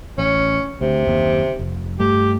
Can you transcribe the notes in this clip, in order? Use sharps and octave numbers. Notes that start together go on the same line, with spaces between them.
A1 C#4
D2 C3
F#1 D#2
F1
G2 A3 G4